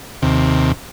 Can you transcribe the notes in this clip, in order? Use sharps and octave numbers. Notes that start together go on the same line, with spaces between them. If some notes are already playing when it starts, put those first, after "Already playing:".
D#2 C3